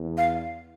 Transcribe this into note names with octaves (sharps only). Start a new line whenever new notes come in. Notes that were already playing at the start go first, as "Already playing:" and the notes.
Already playing: E2
F5